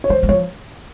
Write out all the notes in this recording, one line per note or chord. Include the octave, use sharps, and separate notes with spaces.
C#5
E3 C5
F#3
F3 C#5